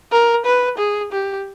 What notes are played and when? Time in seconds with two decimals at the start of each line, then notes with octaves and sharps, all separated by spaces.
0.12 A#4
0.45 B4
0.78 G#4
1.12 G4